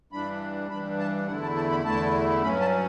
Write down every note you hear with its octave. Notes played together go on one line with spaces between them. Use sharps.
G2 E3 G3 D4 B5
G2 E3 G3 D4 B5
A5
E2 D3 A3 E4 F#5
A5
A5
B5
E2 D3 A3 E4 A5
G2 F#3 C#4 B5
A5